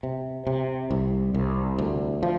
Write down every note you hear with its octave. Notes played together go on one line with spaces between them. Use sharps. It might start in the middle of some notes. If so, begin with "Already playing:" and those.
C3
C3
C2
C2
D2
F3